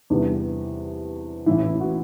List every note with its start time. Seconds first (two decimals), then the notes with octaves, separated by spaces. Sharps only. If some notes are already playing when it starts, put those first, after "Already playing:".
0.10 E2 C3 G3 B3 D4
1.46 A1 A2 E3 E4
1.63 E4
1.80 F#4